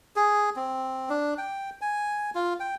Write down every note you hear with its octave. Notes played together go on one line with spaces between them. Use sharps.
G#4
C4
D4
G5
G#5
F4
G5